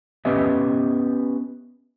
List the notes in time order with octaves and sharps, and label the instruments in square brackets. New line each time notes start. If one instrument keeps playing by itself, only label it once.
[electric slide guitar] B3 C#4 G4 B4 D#5 E5